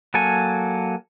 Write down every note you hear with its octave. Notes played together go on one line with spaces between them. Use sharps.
F#3 A#3 A4 G#5